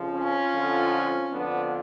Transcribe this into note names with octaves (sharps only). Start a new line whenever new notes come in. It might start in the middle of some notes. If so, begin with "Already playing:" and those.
Already playing: F2 C#3 F3
C#4 F4
F2 D3 F3
F2 D3 F3 B3 D4